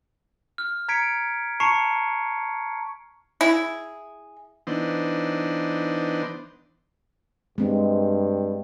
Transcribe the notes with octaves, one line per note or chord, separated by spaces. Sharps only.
F6
A#5 G#6 B6 C#7 D7
A5 A#5 C#6 C7 C#7
E4 G#4
E3 B3 D4 D#4 C5
G2 G#3 C4